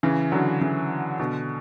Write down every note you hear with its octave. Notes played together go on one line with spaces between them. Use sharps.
C#3 E3
D3 F#3
C#3 E3
B2 D3